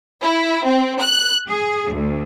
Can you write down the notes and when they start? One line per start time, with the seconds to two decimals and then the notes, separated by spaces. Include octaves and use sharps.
0.21 E4
0.65 C4
1.00 F#6
1.48 G#4
1.91 D2